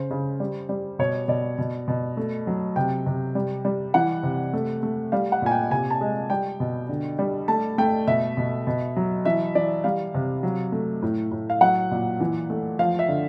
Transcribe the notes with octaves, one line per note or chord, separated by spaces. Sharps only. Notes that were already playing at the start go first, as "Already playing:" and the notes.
Already playing: C#3 C5
C#3
G3
G3
B2 C#5
B2 D5
B2
B2
A3
F#3
C3 G5
C3
G3
G3
E3 F#5
C3
A3
A3
G3 F5
F#5
A#2 G#5
G5
C3 G#5
A5
G#3
G3 G5
B2
D3
G3
A3 A5
A3 G5
B2 E5
B2
B2
F#3
E3 E5
E3 D5
G3 F5
C3
F#3
A3
A2
A2
F5
F#3 F#5
A#2
E3
A3
F3 F5
E5
D3